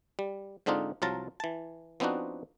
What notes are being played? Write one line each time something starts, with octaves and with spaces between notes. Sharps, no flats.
G3
G#2 D3 C4 D4 D#4 F4
C2 F3 F#3 F4 A5 A#5
E3 A5
F3 B3 C4 D4 D#4 F#4